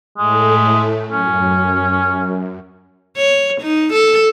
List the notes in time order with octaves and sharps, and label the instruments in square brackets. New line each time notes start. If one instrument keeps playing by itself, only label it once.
[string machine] A2 A3 [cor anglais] G#3
[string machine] F#2 [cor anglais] C#4
[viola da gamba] C#5
D#4
A4